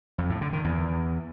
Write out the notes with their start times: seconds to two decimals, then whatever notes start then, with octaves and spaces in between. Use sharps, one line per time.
0.18 F2
0.30 A2
0.41 D3
0.53 D#3
0.64 E2